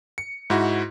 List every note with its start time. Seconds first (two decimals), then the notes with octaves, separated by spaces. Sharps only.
0.18 C#7
0.50 G#2 E4 F#4